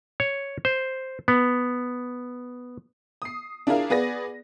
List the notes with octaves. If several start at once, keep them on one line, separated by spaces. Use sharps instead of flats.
C#5
C5
B3
D#6 C7
D4 E4 F4 G#4 A#4 F5
B3 G#4 B4 D5 A#6